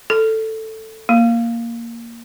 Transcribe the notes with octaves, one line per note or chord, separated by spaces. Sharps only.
A4
A#3